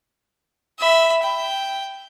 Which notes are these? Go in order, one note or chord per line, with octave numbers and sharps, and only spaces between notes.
E5 B5
G5